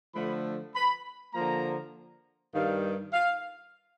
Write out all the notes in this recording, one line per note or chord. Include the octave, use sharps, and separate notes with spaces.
D3 F3 A3 B5
B5
D3 F3 A#3 A#5
G2 D#3 G3 F5
F5